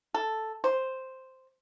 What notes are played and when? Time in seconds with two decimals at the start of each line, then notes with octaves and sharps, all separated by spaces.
0.14 A4
0.64 C5